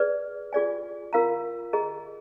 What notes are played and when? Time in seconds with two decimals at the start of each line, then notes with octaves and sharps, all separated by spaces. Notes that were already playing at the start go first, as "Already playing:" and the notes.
Already playing: G#4 B4 D5
0.53 F4 G#4 D5 G#5
1.13 F4 A#4 F5 A#5
1.73 G#4 D#5 A#5